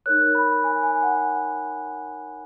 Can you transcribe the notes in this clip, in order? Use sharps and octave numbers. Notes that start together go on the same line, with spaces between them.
D#4 A#4 C#5 F#6
B5
G#5
G#5
F#5